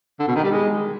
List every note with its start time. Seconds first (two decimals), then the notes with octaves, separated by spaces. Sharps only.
0.19 D3
0.27 B2
0.35 D#3
0.43 G3
0.51 G#3